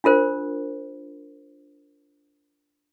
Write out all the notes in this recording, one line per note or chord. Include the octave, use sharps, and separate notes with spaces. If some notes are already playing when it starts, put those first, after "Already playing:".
D4 F4 A#4 C5